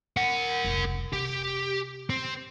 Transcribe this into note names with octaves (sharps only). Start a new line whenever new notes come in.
A#4 F#5
F1 C#2
C3 G4
C4